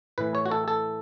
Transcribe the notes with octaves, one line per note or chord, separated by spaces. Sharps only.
A2 E3 B4
C#5
F#4
A4
A4